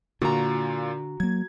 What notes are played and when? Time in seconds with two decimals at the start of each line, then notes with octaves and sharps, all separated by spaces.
0.22 A#2 D3 F4 F#4 A#5
1.20 F#3 A#3 G#6